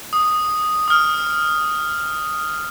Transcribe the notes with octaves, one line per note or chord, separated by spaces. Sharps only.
D#6
D#6 F6